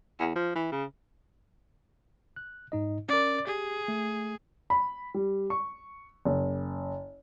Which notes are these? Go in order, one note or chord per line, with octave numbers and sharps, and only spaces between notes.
E2
F3
E3
C#3
F#6
G#2 D#4 D#5
C#4 A#4 D5
G4 G#4
A3
B5
G3
C#6
F#1